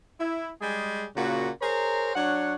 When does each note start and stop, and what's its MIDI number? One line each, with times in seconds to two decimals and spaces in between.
0.20 0.50 64
0.61 1.05 55
0.61 1.05 56
0.61 1.05 68
1.16 1.49 46
1.16 1.49 49
1.16 1.49 58
1.16 1.49 66
1.61 2.14 68
1.61 2.14 70
1.61 2.14 72
1.61 2.14 73
1.61 2.14 82
2.15 2.54 54
2.15 2.54 62
2.15 2.54 73
2.15 2.54 78